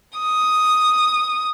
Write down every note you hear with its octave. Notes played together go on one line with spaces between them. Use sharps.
D#6